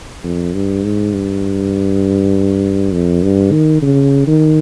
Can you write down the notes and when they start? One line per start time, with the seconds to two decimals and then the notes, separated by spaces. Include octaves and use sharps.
0.24 F2
0.54 G2
0.84 G#2
1.14 G2
2.93 F2
3.23 G2
3.52 D#3
3.82 C#3
4.27 D#3